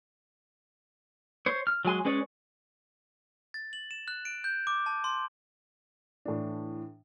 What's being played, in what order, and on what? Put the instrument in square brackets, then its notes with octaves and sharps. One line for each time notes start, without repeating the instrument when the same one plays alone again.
[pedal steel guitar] C5 C#5
F6
F#3 G#3 G#5 C6
G#3 C#4 B4 C#5 D5
[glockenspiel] A6
F#7
E7
F#6
D7
G6
D6
A5
C6
[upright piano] A2 E3 D4